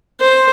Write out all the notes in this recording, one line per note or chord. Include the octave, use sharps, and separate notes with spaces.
C5